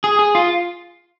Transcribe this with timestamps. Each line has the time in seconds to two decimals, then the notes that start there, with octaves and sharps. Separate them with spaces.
0.04 G#4
0.19 G#4
0.35 F4